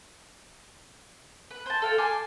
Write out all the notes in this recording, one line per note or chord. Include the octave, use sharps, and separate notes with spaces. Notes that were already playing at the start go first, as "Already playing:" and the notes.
B4
C5 A5
A4 F5 G5
G#5 A5 C6 D6